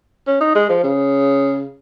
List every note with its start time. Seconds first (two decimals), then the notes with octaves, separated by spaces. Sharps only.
0.27 C#4
0.41 D#4
0.55 G#3
0.69 F3
0.83 C#3